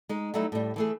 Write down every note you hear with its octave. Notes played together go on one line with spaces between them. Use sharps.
G#3 D#4
F#3 G3 A3 D#4 E4 F#4
A2 G3
E3 A3 G#4